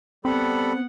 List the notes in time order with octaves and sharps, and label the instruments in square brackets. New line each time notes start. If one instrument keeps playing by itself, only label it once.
[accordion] G3 A4 B5 [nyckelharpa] B3 F#5 [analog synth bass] C4